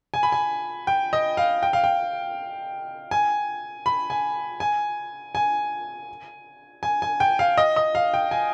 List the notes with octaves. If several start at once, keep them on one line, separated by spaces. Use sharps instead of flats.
G#5
B5
G#5
G5
D#5
F5
G5
F5
G5
G#5
B5
G#5
G#5
G#5
G#5
G#5
G5
F5
D#5
D#5
F5
G5
G#5